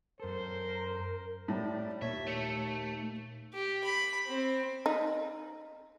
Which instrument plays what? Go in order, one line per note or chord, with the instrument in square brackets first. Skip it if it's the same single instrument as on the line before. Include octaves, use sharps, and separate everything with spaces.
[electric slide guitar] F#2 A4 [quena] A#4 [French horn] C5
[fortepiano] A2 [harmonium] G3 G4
[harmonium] D#2 A5 [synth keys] A#2 [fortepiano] C#5 [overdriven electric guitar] E5
[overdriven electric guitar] A3
[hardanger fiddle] G4
B5
C4
[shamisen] D#4